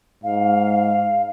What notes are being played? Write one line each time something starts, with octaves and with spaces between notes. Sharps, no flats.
G#2 F5